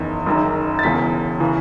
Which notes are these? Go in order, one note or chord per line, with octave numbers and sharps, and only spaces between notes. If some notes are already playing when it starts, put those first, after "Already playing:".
Already playing: F#1 E2 D#3
F#1 F#2 D#3
A6
E1 E2 C#3 E3 B6
C#3 E3